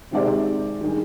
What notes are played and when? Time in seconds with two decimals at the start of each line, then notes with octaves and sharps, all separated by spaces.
0.12 C3 D#3 G#3 C4 G4 D5
0.81 D#3 G3 D4 G#4